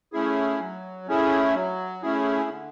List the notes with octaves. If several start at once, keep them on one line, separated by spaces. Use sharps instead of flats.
A3 C#4 E4 G#4
F#3
A3 C#4 E4 G#4
F#3
A3 C#4 E4 G#4
D3